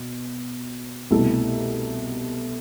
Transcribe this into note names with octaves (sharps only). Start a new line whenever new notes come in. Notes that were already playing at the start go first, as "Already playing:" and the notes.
Already playing: B2
C2 B2 A3 E4 A4